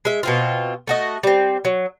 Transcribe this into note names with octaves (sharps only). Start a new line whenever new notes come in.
G#3 E5
B2 C4 F4
A3 F#4 D#5
G3 C4
F#3